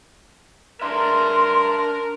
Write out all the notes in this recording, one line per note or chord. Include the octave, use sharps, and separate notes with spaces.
D4 A#4 B4 E5 C6